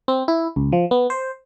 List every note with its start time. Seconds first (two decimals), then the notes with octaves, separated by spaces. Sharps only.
0.08 C4
0.28 E4
0.56 C#2
0.72 F3
0.91 B3
1.10 C5